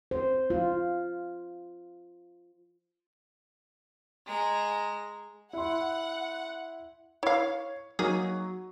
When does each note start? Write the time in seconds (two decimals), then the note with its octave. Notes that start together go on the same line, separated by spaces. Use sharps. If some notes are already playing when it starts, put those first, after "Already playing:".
0.11 C5
0.50 F4
4.26 G#3 A#5
5.53 E4 F#5 C6
7.23 E4 C#5 F5
7.99 F#3 A#3 D#4 G#4